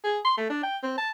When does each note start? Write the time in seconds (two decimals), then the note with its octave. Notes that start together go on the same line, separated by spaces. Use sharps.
0.04 G#4
0.25 C6
0.37 A3
0.50 D4
0.63 G5
0.83 C4
0.98 A5